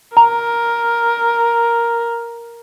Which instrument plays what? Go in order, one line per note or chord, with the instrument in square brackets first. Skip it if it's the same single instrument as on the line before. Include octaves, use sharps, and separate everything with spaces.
[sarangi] A#4 [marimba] A#5